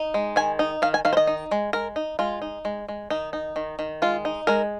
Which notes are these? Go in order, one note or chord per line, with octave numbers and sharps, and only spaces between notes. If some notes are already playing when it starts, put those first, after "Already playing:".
Already playing: D#4
G#3
D#3 G#5
D#4
D#3 F5
G#5
D#3 F5
C5
D#5
D#4
G#3
G#3 A#4
D#4
G#3 F4
D#4
G#3
G#3
D#3 D#4
D#4
D#3
D#3
G#3 F4
D#4
G#3 A#4